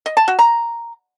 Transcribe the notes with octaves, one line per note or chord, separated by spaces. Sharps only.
D#5
A5
F#4
A#5